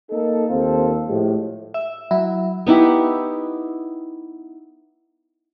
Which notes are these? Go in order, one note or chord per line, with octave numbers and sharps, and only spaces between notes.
A#3 D#4 A4
D#2 C4 F4 A4
A2 F3 G#3 G4
E5
F#3 E4
B3 D#4 E4 G4